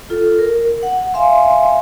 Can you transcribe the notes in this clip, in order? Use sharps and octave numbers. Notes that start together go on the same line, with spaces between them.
F4 A4
A#4
F#5
E5 F5 G#5 C6